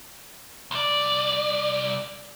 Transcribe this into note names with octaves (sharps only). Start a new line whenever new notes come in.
C2 D5